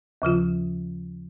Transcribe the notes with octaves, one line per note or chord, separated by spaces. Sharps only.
D#2 C#3 F3 F4